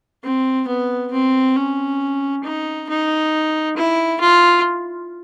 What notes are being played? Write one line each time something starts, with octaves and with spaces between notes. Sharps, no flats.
C4
B3
C4
C#4
D#4
D#4
E4
F4